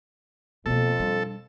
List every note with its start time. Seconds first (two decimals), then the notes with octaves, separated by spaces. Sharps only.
0.66 F2 B2 A#3 A4
0.99 G3 D4